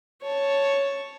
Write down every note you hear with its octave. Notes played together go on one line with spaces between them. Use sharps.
C#5 A5